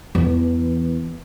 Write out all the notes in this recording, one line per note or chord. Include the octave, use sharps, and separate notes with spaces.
E2 E3